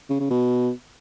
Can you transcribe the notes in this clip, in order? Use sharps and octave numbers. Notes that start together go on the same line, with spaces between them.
C#3
C#3
B2